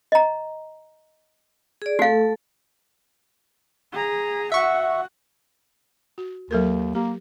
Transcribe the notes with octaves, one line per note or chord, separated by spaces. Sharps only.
D#5 A#5
G#4 D5
A3 F#4 A4 F5
G#4 A#5
F#4 E5 F#5 C#6
F#4
D#2 F#3 A4 A#4
A#3 G4